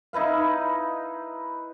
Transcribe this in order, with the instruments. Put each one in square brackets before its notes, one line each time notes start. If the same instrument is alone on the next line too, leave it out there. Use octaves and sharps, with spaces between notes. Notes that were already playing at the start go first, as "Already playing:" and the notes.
[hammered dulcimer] D#4 E4 B4 F5